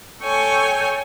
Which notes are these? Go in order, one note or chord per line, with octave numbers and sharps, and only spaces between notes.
A4 C#5 G5 G#5 C#6